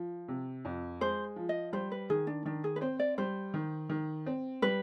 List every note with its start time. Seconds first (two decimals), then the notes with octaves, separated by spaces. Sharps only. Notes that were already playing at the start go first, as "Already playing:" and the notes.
Already playing: F3
0.28 C3
0.65 F2
1.01 G#3 C5
1.36 F3
1.49 D#5
1.73 G3 C5
1.92 B4
2.10 D#3 G#4
2.27 D4
2.45 D#3 D4
2.64 G#4
2.76 B4
2.81 C4 C5
2.99 D5
3.18 G3 C5
3.54 D#3
3.90 D#3
4.26 C4
4.62 G3 B4